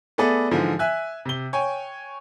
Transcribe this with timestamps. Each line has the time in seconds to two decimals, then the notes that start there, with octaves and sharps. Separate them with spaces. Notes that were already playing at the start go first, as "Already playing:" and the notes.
0.18 A3 B3 G#4 A4 D5
0.51 G#2 D3 E3 F3
0.79 E5 G#5 F#6
1.25 C3 G7
1.53 C#5 G5 G#5